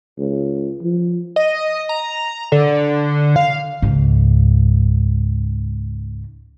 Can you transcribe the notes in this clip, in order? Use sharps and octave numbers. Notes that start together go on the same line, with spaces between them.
C#2
F3
D#5
A#5
D3
F5
C#2 G#2